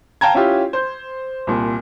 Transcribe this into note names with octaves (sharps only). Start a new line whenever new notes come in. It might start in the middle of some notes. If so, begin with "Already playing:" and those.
F5 G5 A5 A#5 G#6
C#4 E4 F4 G4
C5 G6
C2 A#2